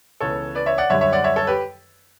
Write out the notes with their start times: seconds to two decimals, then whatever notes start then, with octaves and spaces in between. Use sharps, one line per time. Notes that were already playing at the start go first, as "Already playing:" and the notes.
0.20 C#2 C#3 E3 B3 A4 C#5
0.55 B4 D5
0.66 C#5 E5
0.78 D5 F#5
0.90 F#2 D3 G3 C#5 E5
1.01 C#5 E5
1.13 D5 F#5
1.24 C#5 E5
1.36 A4 C#5
1.47 G4 B4